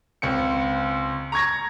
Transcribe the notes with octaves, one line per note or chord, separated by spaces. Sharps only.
C#2 C4 C#7
A#5 C#6 G#6 A#6